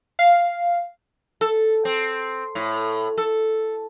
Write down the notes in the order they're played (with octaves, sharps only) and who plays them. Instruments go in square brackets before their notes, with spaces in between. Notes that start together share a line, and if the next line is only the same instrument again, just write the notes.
[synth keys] F5
[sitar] A4
C4
A2
A4